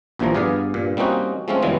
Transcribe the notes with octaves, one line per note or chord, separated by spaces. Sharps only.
A#1 D#2 A#2 E3 F3 A#5
G2 B3 G#4 D5 F5
G2 A#2
G3 A#3 C4 C#4 D#4 F#4
F3 G#3 A3 C4 C#4 F4
F#2 C#3 E3 G3 G#3 B3